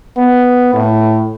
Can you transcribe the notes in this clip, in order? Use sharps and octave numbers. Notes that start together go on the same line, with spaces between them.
B3
A2